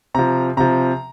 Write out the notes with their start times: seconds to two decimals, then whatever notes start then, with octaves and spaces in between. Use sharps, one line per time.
0.14 C3 F3 A#5
0.57 C3 F3 A#5